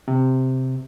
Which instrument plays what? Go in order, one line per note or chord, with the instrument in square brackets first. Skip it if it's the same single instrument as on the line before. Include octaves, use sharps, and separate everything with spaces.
[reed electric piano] C3